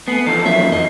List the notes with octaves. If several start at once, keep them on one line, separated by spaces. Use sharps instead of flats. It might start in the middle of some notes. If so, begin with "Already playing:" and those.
A3 B3 G#5 C7
E2 F3 D#4 A4 A5
F#3 A#3 C#4 E5
F2 D#5